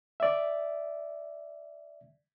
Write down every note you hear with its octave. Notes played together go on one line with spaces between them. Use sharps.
D5 E5